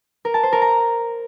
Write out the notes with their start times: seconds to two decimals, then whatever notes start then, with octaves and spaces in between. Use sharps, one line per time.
0.25 A#4
0.34 A5
0.43 C5
0.52 A#4
0.62 A#5